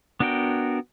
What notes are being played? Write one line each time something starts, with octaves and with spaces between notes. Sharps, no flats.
B3 D4 F#4 A#4 G5